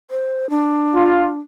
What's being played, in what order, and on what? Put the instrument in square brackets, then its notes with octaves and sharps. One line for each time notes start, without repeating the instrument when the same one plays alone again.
[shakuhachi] C5
D4
[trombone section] F4